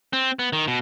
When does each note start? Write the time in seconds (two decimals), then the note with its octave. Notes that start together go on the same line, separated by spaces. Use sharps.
0.13 C4
0.39 B3
0.53 D#3
0.67 B2